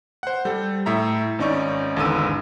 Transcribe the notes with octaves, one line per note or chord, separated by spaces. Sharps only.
C5 F#5
G3 A4 G6
A2 E5 A#5
G#1 C#4 D#4 D5 C#6
G#1 E2 D3 E6 D#7